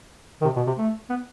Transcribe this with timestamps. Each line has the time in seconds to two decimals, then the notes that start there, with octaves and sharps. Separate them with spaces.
0.41 D#3
0.45 C3
0.56 B2
0.67 C3
0.78 A3
1.09 B3